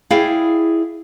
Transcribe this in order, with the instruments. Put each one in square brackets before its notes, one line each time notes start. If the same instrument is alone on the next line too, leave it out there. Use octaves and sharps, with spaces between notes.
[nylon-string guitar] E4 G#4 D5 F5 G5